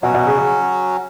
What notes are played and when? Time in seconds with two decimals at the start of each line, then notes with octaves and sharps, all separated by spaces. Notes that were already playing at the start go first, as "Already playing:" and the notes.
0.02 B2 F#3 C#4 F#4
0.14 B2
0.27 C#3
0.38 C#3